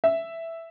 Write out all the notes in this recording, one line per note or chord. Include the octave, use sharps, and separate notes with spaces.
E5